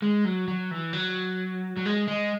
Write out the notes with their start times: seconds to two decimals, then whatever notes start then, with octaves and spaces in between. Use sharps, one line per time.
0.02 G#3
0.25 F#3
0.48 F#3
0.71 E3
0.93 F#3
1.77 F#3
1.85 G#3
2.07 G#3